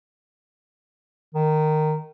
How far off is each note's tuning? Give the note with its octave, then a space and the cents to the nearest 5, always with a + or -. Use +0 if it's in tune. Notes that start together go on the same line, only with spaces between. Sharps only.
D#3 -15